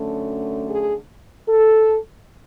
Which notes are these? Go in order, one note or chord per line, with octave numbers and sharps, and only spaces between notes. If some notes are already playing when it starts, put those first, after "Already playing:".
Already playing: F#2 D3 A3 C#4
G#4
A4